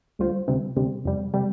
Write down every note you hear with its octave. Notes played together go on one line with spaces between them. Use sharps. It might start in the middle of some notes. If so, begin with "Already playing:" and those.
D2 D3 G3 F4 C5
D2 C3 G3 C4
D2 C3 G3 C4
F2 C3 G3
C3 G3